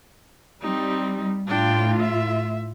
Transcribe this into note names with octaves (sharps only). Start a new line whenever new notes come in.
G3 C4 D#4
A2 D4 F4 G5
E5